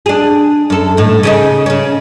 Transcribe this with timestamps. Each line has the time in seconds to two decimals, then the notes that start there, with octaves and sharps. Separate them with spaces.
0.06 D4 G#4
0.70 F#2 A4
0.97 D#2 A2
1.23 C#3 C#4 D#4
1.66 C#3 C#4